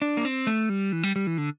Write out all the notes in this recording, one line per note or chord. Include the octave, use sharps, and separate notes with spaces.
D4
A#3
C4
A3
G3
E3
G3
G3
E3
D3